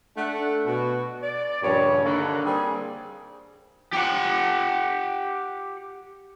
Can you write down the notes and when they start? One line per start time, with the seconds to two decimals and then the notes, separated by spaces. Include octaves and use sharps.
0.17 A3 D4 A4 F#5
0.66 B2 F#4
1.23 D5
1.62 G2 A#2 C#3 F3 C#5
2.05 D3 D#3 A#3 D4 A4 B4
2.46 G3 A#3 C4 G#4
3.93 G4 F#5